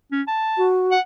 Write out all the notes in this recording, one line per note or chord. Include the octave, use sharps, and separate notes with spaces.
C#4
A5
F#4
F#5